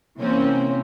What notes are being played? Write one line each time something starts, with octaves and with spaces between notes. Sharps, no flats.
C3 E3 A#3 C4 C#4